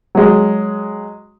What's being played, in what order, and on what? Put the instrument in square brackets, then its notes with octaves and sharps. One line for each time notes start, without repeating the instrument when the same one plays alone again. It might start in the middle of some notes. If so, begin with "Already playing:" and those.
[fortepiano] F#3 G#3